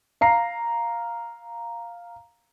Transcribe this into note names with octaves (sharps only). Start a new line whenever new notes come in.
F5 A#5 C7